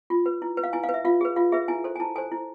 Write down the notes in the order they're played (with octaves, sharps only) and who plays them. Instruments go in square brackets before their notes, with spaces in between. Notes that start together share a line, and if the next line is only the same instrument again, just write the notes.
[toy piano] F4
B4
E4
B4
F5
E4 G#5
F5
B4
E5
F4 F5
G#4 B4
F4 F5
G#4 B4 E5
E4 G#5
A4 C5
G#5
E4 A5
A4 C5 G#5
E4